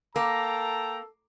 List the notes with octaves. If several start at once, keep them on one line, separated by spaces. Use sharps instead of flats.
A#3 A4 G5 A5 A#5